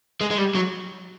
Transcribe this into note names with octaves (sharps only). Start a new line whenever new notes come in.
G#3
G#3
G3
F#3